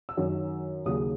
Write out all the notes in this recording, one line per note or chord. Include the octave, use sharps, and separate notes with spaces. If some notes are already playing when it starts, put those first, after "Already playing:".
E6
F#2 D#3 F#3
D#2 C#3 F#3 D#6